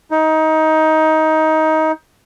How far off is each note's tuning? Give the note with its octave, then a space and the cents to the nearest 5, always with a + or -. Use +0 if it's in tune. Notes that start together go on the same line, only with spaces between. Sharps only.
D#4 +20